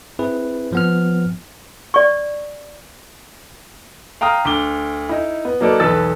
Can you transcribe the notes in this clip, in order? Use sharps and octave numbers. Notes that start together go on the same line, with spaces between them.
C4 E4 G#4 B4
F3 B3 F6
D5 C#6
F5 G5 A#5 D#6 F6
D2 D6 G7
D#4 E4
B3
F#3 A#3 D#4 A4 B4 D5
B1 E2 A4 B4 E6 A6